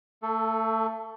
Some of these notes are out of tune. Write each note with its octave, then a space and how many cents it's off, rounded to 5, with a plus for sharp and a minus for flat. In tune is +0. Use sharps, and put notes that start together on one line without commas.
A3 +30 A4 +0